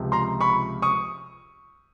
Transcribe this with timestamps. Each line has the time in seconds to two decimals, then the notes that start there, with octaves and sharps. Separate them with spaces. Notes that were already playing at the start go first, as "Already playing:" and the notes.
Already playing: C#2 C3 F3
0.12 A#5 C6
0.41 B5 C#6
0.82 C#6 D#6